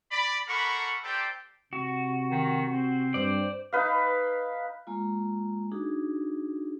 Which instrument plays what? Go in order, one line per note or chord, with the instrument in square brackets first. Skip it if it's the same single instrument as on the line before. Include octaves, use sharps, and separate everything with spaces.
[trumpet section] D5 B5
A#3 A4 A#4 F#5 B5 C#6
A#3 G4 A4 C5 D5 G5
[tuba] C3 [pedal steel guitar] F#4
[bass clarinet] D#3
C4
[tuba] G2 [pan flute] C5 [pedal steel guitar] D5
[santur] D#4 B4 F5
[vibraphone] G#3 A#3 F4
D4 D#4 F#4 G#4